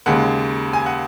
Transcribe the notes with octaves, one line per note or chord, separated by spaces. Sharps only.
D#2 C#3 G#3 F#5
G#5
F#5